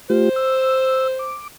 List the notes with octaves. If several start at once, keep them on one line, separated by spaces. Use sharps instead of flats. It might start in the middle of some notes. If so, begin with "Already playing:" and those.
A3 F4 G4 C5
E6
D6